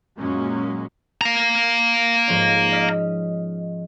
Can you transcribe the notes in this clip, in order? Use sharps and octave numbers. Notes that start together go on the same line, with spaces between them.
F#2 A#2 F#3 G#3 A#3 C#4
F5 A#5
G#2 F3 C#4
D#5 F6 B6